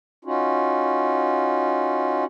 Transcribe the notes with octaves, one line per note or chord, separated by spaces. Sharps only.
C#4 D#4 F4 F#4